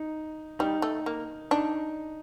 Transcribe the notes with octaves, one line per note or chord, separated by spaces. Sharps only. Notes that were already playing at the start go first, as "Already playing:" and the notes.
Already playing: D#4
G3 D#4
A3
A#3
D4 D#4